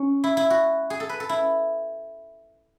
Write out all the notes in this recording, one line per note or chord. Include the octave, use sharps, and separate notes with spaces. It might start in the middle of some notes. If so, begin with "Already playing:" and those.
Already playing: C#4
E4
E4
F#4
G#4
A4
B4
A4
E4